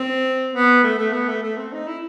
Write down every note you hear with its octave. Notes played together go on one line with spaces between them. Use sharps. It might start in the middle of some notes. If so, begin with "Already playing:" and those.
Already playing: C4
B3
A3
A3
B3
A3
A3
C4
D#4
E4